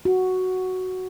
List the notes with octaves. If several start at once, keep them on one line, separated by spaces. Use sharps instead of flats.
F#4